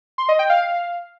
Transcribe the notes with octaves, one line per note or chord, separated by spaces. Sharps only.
C6
D#5
G5
F5